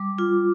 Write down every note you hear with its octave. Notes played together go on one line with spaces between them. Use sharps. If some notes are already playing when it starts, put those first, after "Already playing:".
Already playing: G3 D6
F4